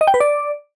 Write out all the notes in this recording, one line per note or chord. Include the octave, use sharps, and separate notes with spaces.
D#5
G5
B4
D5